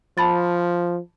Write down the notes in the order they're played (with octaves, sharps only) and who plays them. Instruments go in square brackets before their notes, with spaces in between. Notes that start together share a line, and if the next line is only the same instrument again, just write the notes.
[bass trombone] F3 [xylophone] A5 B5 A6